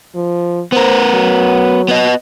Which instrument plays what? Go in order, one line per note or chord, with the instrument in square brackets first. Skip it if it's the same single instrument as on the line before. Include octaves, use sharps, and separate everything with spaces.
[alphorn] F3
[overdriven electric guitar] B3 A#4 [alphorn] C5
[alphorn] F#3
[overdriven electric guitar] B3 D#5